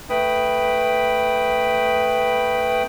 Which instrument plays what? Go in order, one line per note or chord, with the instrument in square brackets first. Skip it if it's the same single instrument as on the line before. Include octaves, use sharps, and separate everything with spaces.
[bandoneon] A3 B4 G5 B5 D#6